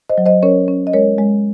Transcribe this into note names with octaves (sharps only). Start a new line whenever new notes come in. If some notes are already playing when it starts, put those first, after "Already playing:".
C5 D#5
F#3
C5 D#5
C#4 A#4 C#5
C#4
D#5
G#3 A#4 C#5
G#3